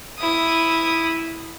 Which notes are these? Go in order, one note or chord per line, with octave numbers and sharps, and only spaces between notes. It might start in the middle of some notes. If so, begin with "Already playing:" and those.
E4 D#6